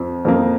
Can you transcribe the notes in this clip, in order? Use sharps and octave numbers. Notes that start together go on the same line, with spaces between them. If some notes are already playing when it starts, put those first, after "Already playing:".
Already playing: F2 F3
F2 F3 A#3